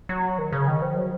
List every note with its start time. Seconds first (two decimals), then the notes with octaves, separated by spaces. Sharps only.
0.09 F#3
0.38 D#3
0.53 C#3
0.68 D#3
0.82 F3
0.97 F#3